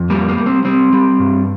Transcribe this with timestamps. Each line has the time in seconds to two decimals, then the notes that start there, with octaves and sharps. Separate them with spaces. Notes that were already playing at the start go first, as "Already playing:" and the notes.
Already playing: F2
0.10 G3 A#3
0.29 A#3
0.37 G3
0.46 C4
0.65 G3 C4
0.93 G3
1.19 G2